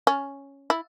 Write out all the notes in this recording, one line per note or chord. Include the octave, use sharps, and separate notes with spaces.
C#4
E4